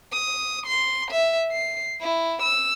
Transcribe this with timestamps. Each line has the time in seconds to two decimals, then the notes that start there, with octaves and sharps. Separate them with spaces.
0.13 D#6
0.67 C6
1.11 E5
1.52 C7
2.01 E4
2.43 E6